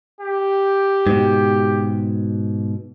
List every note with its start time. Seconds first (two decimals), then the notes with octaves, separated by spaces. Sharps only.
0.21 G4
1.07 G#2 B2